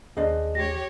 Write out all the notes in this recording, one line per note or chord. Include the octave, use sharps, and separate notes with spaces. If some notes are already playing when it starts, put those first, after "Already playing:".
D#2 D4 G#4 C5 D#5
G4 C#5 A#6